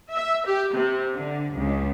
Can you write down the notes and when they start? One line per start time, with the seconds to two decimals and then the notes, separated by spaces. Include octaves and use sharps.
0.12 E5
0.46 G4
0.75 C3
1.15 D3
1.55 C#2